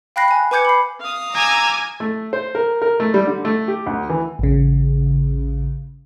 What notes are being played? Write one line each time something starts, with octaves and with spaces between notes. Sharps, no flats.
F5 G5 B5 F#6 A#6 C7
G#5 F#6
B4 G#5 D6 G6 G#6 C#7
B5 C7
F5 D#6
G#5 A#5 D6 E6
A3
C5
A#4
A#4
A3
G3
D3
A3
G4
D2
E3
A1 C#3